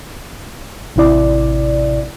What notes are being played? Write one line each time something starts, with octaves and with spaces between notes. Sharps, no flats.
A1 C3 E4 D5